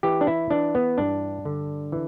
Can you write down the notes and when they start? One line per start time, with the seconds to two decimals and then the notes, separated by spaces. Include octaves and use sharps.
0.03 E3 G4
0.21 D4
0.27 E4
0.51 E3 D4
0.75 B3
0.98 G2 D4
1.45 D3
1.92 E3